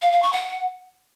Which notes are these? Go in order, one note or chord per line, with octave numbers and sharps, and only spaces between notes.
F5
F5
C#6
F#5